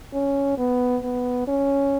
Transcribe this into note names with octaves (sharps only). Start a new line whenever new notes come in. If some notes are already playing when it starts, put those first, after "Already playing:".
C#4
B3
B3
C#4